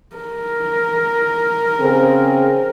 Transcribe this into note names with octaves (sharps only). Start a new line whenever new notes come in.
A#4
C#3 C4 G#4